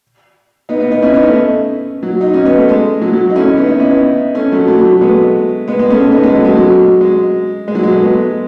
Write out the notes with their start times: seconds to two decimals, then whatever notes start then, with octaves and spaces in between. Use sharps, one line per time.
0.69 B3 D#4
0.80 B3 D#4
0.91 B3 D#4
1.02 C#4 E4
1.14 B3 D#4
1.24 A3 C#4
2.03 F#3
2.21 D#4
2.34 C#4
2.46 B3
2.57 A3
2.69 G#3
3.01 F#3 A3
3.12 F#3 A3
3.30 D#4
3.35 C#4 E4
3.57 B3 D#4
3.68 B3 D#4
3.80 C#4 E4
3.91 B3 D#4
4.35 A3 C#4
4.52 F#3 A3
4.67 F#3 A3
4.84 F#3 A3
5.01 G#3 B3
5.68 G#3 B3
5.79 G#3 B3
5.90 A3 C#4
6.01 A3 C#4
6.12 B3 D#4
6.23 G#3 B3
6.34 F#3 A3
6.45 G#3
6.56 F#3
7.01 G#3
7.68 G#3
7.75 F#3
7.83 G#3
7.91 F#3 A3
8.00 G#3 B3